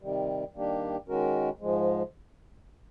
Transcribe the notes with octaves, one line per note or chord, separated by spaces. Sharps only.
C3 D#3 G3
D#3 G3 A#3 D4 G4
D#3 G#3 C#4 F#4 A#4
G#2 F3 G#3